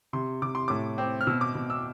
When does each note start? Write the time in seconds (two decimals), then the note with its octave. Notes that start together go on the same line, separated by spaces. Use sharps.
0.13 C3 C6
0.42 C3 D6
0.55 C6
0.68 A2 D6
0.98 C4
1.21 F6
1.27 B2 E6
1.41 D6
1.55 B2
1.70 E6